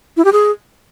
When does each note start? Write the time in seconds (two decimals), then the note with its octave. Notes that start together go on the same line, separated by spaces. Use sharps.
0.17 E4
0.25 G4
0.33 G#4